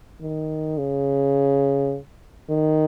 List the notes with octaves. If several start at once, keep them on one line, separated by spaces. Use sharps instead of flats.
D#3
C#3
D#3